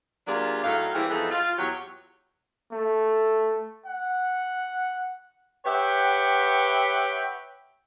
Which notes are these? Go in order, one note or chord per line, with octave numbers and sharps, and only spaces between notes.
F#3 A#3 D4 F4 G4 G#4
A2 F#3 A3 D#4 F5
E3 G3 A#3 C4 E4 G#4
E2 E3 F3 D#4 G#4 A4
F4
E2 F#3 G4 C#5
A3
F#5
G4 B4 C#5 E5 F#5 G5